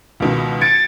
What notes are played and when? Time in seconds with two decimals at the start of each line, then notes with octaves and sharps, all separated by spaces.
0.20 C#2 B2 D#3
0.61 G#6 A6 C#7 D7